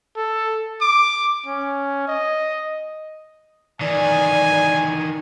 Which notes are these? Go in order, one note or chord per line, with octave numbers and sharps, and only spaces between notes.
A4
D6
C#4
D#5
D#3 E3 D5 G#5